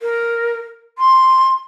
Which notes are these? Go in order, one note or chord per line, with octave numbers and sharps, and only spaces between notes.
A#4
C6